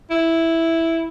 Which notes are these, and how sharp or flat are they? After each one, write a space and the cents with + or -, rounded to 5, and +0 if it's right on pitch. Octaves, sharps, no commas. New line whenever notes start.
E4 -5